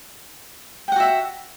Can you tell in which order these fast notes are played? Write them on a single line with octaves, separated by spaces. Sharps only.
G5 F#5 F#4 E5